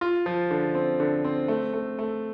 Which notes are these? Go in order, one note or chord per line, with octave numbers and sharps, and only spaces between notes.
F4
F3
D3
C4
D3
C4
A3
A3
A3